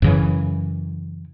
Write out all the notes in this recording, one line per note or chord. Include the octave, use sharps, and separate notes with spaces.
F#2 C#3 E3